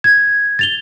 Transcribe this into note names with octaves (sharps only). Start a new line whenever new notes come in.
G#6
A6 F7 G7